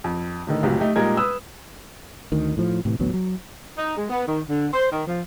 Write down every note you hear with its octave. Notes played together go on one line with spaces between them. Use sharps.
F2
A2 D3 D#3
F#1 C#2 A2 C3 F3 F#3
A3 D#4 G4
A#2 G3 G#3 D#4 A#4 G#6
B4 D#6 E6
D2 D#3
A2 F3
A2 C3 E3
A1 D2 F#3 B3
F#3
D#4
G#3
B3
D#3
D3
C5
D#3
F3